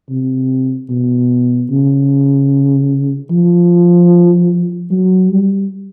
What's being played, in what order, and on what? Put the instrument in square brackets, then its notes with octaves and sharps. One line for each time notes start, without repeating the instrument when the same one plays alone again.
[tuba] C3
B2
C#3
F3
F#3
G3